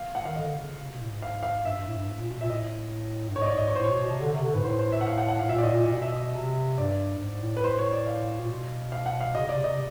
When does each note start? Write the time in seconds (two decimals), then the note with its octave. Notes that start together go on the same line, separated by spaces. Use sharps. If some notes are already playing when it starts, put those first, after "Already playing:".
Already playing: F5
0.15 F#5
0.22 D#3 F5
0.36 D3 D#5
0.57 C#3
0.79 C3
0.90 B2
1.00 A2
1.11 G#2
1.22 F5
1.43 F5
1.65 G2 E5
1.76 G2
1.87 A2
1.97 G2
2.08 G#2
2.19 A#2
2.29 B2
2.40 A#2 E5
2.50 A2 D#5
3.29 G2
3.36 G#2 C#5
3.42 D#5
3.46 D5
3.57 G#2 D#5
3.67 C#5
3.75 C5
3.79 A2
3.84 C#5
3.89 B2
4.00 B2
4.11 C3
4.21 D3
4.32 C3
4.43 D3
4.54 G#2 B4
4.64 A2 C5
4.79 C5
4.92 E5
5.01 F#5
5.07 F5
5.18 F#5
5.29 F#5
5.39 A2 F5
5.49 A#2 E5
5.58 D5
5.63 A2 D#5
5.71 A#2
5.78 D#5
5.87 A#2
5.92 B2 D#5
6.02 E5
6.12 D#5
6.35 C3
6.78 G2 D5
7.17 G2
7.21 G#2
7.42 A2
7.57 B4
7.64 C5
7.79 C#5
7.92 D5
8.06 F5
8.40 A#2
8.49 B2
8.92 F5
9.06 F#5
9.21 F5
9.35 C#3 D#5
9.46 C3 D5
9.57 C#3
9.64 C3 D#5